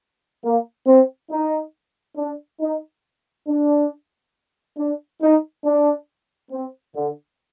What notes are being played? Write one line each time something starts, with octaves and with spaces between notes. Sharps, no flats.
A#3
C4
D#4
D4
D#4
D4
D4
D#4
D4
C4
D3